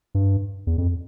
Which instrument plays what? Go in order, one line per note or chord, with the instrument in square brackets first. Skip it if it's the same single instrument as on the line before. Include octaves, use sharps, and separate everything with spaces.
[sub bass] G2
E2
F2